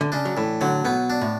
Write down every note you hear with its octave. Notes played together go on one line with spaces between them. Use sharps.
D3
C#3 D4
F#3
A2 E3
D3 F#3
B2 B3
D4
A2